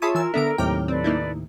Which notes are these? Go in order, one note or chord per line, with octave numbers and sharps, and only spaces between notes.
F4 G#4 C#5 E5 A5 B5 D#6
E3 A#4 G#5 E6
D3 B3 D4 A4 E5 A#5 D7
D#2 A2 C3 F#3 G5 D6 F6
C4 A4 B4 D5
A#3 D#4 E4